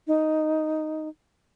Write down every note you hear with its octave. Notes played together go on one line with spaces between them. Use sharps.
D#4